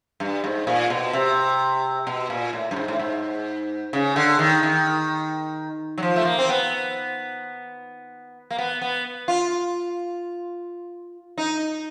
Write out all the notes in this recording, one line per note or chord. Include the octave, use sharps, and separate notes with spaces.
G2
G#2
A#2
B2
C3
B2
A#2
A2
G2
G#2
A2
G#2
C#3
D3
D#3
D#3
F#3
F3
A3
A#3
C4
B3
A#3
B3
B3
F4
D#4